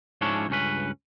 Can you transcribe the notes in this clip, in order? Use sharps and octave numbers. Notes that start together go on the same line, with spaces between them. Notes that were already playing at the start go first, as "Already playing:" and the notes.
G#2 F3 C#4 D4 E4 C#5
C#2 G2 C#4 B4